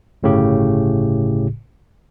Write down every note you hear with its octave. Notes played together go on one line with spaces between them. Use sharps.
G1 A2 C#3 G4